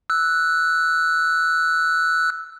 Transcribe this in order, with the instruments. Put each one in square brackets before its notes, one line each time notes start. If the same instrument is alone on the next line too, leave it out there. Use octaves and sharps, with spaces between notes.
[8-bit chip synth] E6 F#6